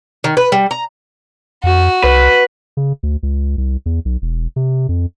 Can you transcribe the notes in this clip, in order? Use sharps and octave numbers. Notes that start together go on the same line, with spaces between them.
D#3
B4
G3
A#5
F2 F#4
C2 B4
C#3
D2
C#2
C2
E2
B1
E1
C3
F2